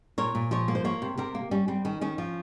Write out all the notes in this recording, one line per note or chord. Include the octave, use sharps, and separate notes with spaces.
A#2 A#4 C#5
A#2
F3 A#4 C#5
A#3
C5
A#3 A#4 C#5
C3
C3 G4 A#4
A#3
G3 C#4
G3 C4
D#3 C#4
D#3 C#4
F3